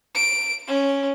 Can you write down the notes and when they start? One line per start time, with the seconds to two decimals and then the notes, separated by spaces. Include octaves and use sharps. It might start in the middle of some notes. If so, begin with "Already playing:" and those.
0.15 D7
0.68 C#4